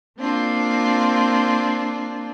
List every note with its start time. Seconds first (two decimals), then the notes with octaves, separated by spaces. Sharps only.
0.19 A#3 C4 D4 F4